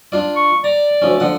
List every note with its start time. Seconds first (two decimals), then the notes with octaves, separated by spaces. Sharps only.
0.12 D4 F4 D5
0.36 C#6
0.64 D5 A#5
1.02 D2 F3 C#4
1.20 D3 F3 F#5